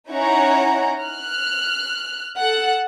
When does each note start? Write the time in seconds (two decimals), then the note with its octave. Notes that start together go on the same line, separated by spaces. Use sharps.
0.10 C#4 D#4 E4 C#5 F#5 A#5
1.02 F6 F#6
2.38 A4 F#5